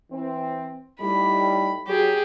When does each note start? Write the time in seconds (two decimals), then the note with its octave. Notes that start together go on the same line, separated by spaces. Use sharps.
0.11 E3 C4
1.01 A2 G3 D#4 B5
1.88 F#3 G4 G#4